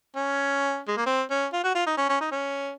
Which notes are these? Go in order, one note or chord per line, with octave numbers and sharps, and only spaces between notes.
C#4
G#3
A#3
C4
C#4
F4
F#4
F4
D#4
C#4
C#4
D#4
C#4